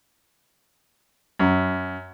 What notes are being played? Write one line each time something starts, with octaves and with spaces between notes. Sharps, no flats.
F#2